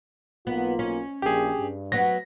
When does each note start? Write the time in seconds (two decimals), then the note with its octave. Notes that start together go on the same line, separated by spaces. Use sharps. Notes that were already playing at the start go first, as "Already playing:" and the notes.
0.47 B1 A#3 B3 F4
0.79 C#4
1.22 A#1 G4 G#4
1.59 G2
1.92 F#3 B3 A#6